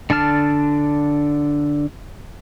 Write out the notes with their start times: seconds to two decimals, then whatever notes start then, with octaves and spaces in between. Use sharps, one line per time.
0.10 D3 D4 A5 F6